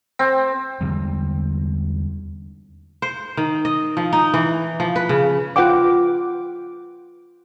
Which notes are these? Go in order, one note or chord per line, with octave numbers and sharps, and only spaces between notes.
C4
E2 D3 G3 G#3
C5
D#3
D#5
F3
D#4
E3
F3
B4
C#3
F4 B4 F#5 G5 D6